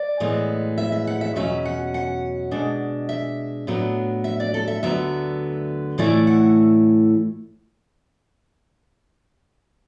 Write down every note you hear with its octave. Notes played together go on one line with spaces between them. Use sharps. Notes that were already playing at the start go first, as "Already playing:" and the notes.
Already playing: D5
A2 E3 G#3 B3
E5
E5
F#5
E5
E2 B2 F#3 C#4 E5
F#5
F#5
B2 G#3 D4
E5
A2 F#3 B3 D4
E5
D5
A4
E5
D2 D3 F#3 B3 E5
A2 E3 A3 E4 D5
F#5